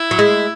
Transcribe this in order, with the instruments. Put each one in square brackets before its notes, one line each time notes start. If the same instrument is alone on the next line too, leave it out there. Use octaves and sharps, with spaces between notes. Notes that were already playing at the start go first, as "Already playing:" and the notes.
Already playing: [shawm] E4
[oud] F#3
G#3